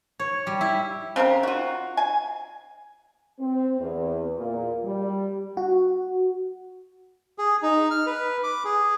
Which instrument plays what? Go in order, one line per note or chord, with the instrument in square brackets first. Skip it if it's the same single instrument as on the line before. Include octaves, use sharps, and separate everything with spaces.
[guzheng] C#5
G3
E4
[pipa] C#3 C4 D#4 A#4
F4 F#4
G#5
[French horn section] C4
E2
A#2
G3
[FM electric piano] F#4
[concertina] G#4
D#4
F6
B4
D6
G#4